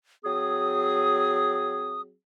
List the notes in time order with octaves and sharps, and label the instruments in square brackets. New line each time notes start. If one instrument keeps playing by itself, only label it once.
[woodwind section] F#3 C4 G#4 [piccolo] D#6